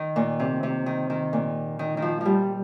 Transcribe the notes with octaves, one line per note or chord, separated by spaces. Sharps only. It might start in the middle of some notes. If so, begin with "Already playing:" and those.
Already playing: D#3
A#2
C3
C3
D#3
D#3
A#2
D#3
D#3
F3
F3 G3